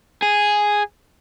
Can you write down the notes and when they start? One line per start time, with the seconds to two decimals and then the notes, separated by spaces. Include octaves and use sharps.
0.22 G#4